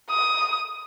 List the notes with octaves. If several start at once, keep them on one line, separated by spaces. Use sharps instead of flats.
D#6